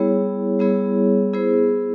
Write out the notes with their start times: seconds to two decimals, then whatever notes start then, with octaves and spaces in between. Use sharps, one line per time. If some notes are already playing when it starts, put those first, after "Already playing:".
Already playing: G3 B3 E4 G#4 C#5
0.59 G3 B3 E4 G#4 C#5
1.33 B3 E4 G#4 C5